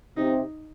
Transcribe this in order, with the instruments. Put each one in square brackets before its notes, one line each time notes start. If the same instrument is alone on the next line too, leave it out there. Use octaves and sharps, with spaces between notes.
[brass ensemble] C3 [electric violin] D#4